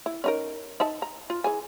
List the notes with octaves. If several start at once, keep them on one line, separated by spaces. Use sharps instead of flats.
E4
C#4 D#4 A#4
D#4 E5 A5
A#5
F4
E3 G#4 G#5